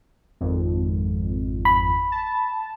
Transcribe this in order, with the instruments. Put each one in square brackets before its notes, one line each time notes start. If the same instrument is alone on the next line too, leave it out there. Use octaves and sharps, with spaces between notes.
[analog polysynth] G#1 F2
[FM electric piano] B5
[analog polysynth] A5